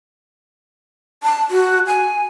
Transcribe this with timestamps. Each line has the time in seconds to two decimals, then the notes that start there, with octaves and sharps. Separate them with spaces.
1.23 A5
1.51 F#4
1.87 G#5